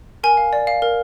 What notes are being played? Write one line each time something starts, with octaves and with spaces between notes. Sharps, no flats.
A#4 G#5
F5
D5
F5
A#4